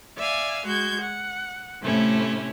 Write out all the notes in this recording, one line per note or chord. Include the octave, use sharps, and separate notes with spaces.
D5 E5 F5 G#5
G#3 F#4 G6 G#6
F#5
A2 C3 A3 C#4 E4